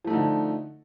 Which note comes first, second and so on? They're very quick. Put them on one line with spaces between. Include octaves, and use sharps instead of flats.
F3 A3 D#4 D3